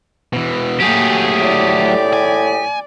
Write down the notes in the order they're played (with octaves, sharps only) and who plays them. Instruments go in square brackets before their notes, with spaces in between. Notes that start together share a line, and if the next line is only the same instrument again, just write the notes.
[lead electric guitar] B2 E3
[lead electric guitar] F#3 A3 [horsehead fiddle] A#3 G5 [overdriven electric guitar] G4 G#4
[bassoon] A2 [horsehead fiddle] D5
[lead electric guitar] G#5